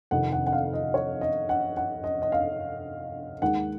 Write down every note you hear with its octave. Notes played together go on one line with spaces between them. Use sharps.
F2 C3 D#3 F#5
F#5
F#5
F5
D#5
C#5
D#5
F#5
F#5
D#5
D#5
F5
D#2 D#3 G#3 F#5